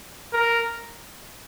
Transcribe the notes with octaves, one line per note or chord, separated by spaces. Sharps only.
A#4